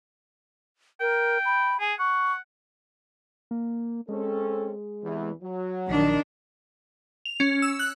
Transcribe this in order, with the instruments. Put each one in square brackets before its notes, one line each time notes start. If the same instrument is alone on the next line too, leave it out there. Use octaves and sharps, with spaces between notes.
[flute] A#4 [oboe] G5
[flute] B5
[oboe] G#4 [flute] G#5
[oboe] F#5 [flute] C#6
[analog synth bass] A#3
[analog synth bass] G#3 [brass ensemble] C4 C#4 A4
[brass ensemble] E2 C3 E3
F#3
[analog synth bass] A#1 [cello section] D#3 D4
[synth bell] F7
C#4
E6
F#6